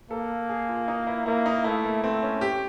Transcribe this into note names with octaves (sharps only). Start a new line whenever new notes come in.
A#3 A4
G#4
F4
D#4
E4
A#3 E4
D#4
A3 E4
A#3
A3 C4
C#4
G4